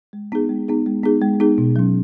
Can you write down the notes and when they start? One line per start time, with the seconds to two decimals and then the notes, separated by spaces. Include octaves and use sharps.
0.13 G#3
0.32 B3 D#4 G#4
0.49 G#3
0.68 B3 D#4 G#4
0.86 G#3
1.04 B3 D#4 G#4
1.22 G#3
1.40 B3 D#4 G#4
1.58 B2
1.76 F#3 C#4